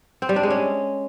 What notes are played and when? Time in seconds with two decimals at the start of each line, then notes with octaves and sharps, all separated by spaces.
0.22 C4
0.29 G3
0.36 D4
0.43 G#3
0.50 C#4